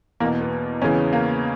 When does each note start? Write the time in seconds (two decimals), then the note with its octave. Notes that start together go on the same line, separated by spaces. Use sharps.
0.20 E2 B2 A#3
0.41 B3
0.82 E2 C#3 E3 C#4
1.13 A#3